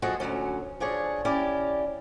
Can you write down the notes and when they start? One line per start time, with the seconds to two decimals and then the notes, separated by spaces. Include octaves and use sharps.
0.02 F3 G#3 F#4 G#4 A4
0.20 D2 A#2 F#3 C#4
0.80 F3 D4 G#4 C#5
1.25 C#4 E4 G4 D5